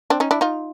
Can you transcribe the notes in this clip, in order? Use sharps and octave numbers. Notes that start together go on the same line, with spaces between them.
C4 D4
C#4 D#4
D4 E4
D#4 F4